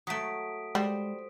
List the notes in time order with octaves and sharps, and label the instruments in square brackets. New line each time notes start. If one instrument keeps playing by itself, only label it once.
[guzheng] F#3 A3 [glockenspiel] D#6 B6 D7
[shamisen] G3 [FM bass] G#3 [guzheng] C5